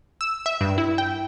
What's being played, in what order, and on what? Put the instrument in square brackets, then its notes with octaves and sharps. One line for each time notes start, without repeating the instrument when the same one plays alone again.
[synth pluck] E6
E5
G2
E4
G5